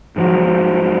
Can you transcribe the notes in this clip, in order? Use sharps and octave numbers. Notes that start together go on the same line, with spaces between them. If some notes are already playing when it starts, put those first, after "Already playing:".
G#2 F3 F#3